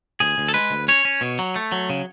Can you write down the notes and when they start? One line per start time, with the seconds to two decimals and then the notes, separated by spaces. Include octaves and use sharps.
0.20 D2 G#4
0.38 D2
0.48 A4
0.54 G#3 B4
0.71 D2
0.88 C#4 C#5
1.05 C#4
1.21 B2
1.39 F#3
1.56 A3
1.72 F#3
1.90 C#3